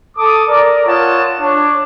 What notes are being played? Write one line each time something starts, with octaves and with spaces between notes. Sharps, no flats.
A4 D6 D#6
A#4 D5
F4 C#5 F#5 A5 D#6
D4 C#5